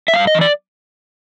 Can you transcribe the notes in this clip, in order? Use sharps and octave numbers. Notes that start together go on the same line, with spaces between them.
E5
G2 F5
D#5
E3
D5